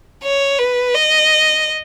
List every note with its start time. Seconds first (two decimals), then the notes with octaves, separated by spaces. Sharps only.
0.24 C#5
0.59 B4
0.94 D#5